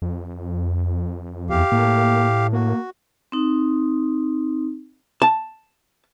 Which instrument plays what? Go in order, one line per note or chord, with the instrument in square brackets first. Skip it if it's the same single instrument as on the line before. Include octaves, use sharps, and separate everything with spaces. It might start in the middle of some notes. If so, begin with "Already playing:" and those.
[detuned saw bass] F2
[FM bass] E2 [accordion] G4 F5
[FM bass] A2 [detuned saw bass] A#3
[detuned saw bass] A#3 [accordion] F#4
[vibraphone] C4 D#4
[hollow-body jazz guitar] A5